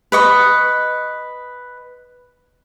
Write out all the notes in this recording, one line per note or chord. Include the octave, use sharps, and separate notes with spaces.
B4 D#5 C#6